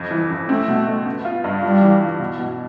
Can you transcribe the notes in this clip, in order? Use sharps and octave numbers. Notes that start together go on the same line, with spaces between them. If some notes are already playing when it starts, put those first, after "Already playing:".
Already playing: F2
E3
F2
A3 C4
B2
A3
B3
F4
G2
G3 F4
E3
E3
B2
B2